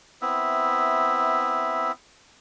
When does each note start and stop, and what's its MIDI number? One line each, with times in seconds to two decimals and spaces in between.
0.21 1.92 59
0.21 1.92 60
0.21 1.92 64
0.21 1.92 76